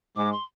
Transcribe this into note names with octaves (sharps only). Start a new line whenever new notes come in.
G#2 G#3 D6
C6